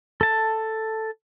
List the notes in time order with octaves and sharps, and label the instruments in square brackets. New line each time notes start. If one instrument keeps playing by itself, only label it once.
[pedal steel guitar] A4 A5